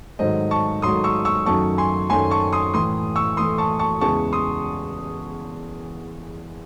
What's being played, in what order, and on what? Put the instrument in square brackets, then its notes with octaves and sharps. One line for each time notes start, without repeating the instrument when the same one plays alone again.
[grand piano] G#2 D#3 F#3 A3 C5 D#5
A5 C#6
G#2 D#3 F#3 A3 C6 D#6
C#6 E6
C#6 E6
F#2 D#3 F#3 A3 A5 C#6
G#5 C6
F#2 D#3 F#3 A3 G#5 C6
A5 C#6
C6 D#6
A2 E3 A3 C6 D#6
C#6 E6
A2 E3 A3 C6 D#6
A5 C#6
A5 C#6
E2 C#3 E3 G#3 A5 C#6
C6 D#6